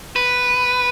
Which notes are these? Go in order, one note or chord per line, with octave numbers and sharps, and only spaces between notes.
B4